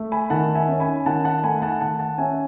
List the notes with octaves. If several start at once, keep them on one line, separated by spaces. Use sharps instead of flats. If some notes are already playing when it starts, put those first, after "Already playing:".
Already playing: A3
G#5 B5
D#3 F#5 A5
E5 G#5
C#4
G#5 B5
D#3 F#5 A5
F#5 A5
A3 G#5 B5
F#5 A5
D#3 F#5 A5
F#5 A5
C#4 E5 G#5